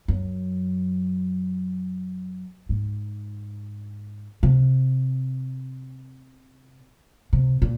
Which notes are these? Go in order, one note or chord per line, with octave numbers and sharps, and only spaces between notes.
F#2
G#2
C3
C3
A#2